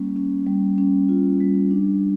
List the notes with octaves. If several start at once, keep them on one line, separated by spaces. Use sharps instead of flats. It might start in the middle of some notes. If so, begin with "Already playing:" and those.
Already playing: G3 A#3 C#4
C#4
G3
C#4
F4
G3
D4